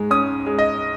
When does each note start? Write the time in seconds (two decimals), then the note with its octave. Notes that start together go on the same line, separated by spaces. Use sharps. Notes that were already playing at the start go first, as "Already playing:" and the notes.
Already playing: G#2 G#3
0.11 C#4 D#6
0.46 G#3
0.58 D#5